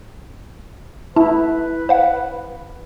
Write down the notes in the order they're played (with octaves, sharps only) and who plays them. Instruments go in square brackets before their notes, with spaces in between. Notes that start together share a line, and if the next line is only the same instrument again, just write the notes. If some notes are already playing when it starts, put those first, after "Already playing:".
[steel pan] E4 [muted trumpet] B4 [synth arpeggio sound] A5
[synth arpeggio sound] C5 F5 F#5